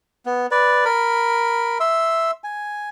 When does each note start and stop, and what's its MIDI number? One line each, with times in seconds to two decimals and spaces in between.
0.26 0.47 59
0.51 0.85 71
0.51 0.85 74
0.85 1.78 70
0.85 1.78 83
1.80 2.31 76
1.80 2.31 84
1.80 2.31 88
2.44 2.89 80